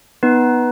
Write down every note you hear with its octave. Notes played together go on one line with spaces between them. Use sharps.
B3 D#4 B4